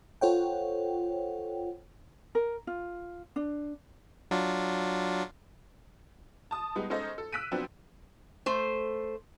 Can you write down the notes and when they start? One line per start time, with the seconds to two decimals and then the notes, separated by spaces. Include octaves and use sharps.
0.21 F4 A4 C5 C#5 F#5 G5
2.35 A#4
2.67 F4
3.36 D4
4.31 F#3 D4 F4
6.51 A5 D#6
6.75 G3 G#3 B3 D#4
6.90 G#3 C#4 D#4 A4 C5 D#5
7.18 A4
7.32 E6 F#6 B6 D7 D#7
7.51 F3 F#3 B3 C4 D4
8.46 A3 C5